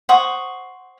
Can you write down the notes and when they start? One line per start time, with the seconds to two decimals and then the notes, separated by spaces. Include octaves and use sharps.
0.09 C5 F#5 C#6 D#6